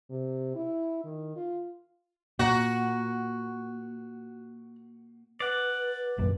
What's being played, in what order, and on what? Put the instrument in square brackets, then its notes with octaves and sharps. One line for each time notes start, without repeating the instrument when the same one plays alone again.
[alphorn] C3
E4
D#3
F4
[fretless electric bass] A#2 [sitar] F#4 [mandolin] F#5 A#5
[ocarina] B4 [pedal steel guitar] D5 F#5
[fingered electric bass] G#1 F#2 A#2